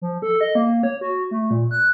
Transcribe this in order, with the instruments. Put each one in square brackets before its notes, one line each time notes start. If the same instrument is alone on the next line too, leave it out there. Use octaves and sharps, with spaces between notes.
[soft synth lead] F3
A4
D#5
A#3
C#5
F#4
A3
A#2
F#6